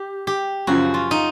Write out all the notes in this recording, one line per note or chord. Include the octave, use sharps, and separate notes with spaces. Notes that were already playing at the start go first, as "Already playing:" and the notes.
Already playing: G4
G4
F#2 C#3 F3 F#4
F4
D#4